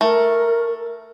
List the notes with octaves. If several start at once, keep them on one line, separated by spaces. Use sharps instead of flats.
A3 A#4